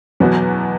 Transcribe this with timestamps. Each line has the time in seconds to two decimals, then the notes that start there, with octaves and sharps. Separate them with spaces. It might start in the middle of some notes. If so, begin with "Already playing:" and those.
0.20 E2 B2 F#3 B3 F#4